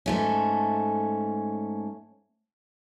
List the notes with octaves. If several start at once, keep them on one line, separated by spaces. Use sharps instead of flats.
G#2 A3 C#4